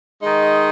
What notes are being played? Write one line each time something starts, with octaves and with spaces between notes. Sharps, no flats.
D#3 G#3 D#4